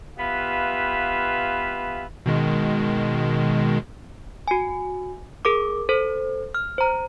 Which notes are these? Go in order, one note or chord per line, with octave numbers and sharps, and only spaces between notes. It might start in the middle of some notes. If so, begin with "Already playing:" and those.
B3 F4 G4 B4 E5 F5
B2 D#3 G#3
F#4 G#5
G#4 A#4 D6
A4 C5
F6
C5 A#5